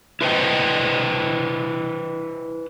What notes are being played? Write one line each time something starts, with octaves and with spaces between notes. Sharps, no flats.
E4 B4 C5 D#5 G5